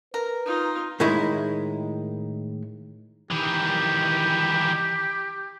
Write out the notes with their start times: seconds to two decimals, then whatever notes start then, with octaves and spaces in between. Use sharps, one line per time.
0.14 A#4 B4
0.46 D#4 F4
1.00 A2 D#3 G#3 E4 B5
3.31 D#3 E3 G4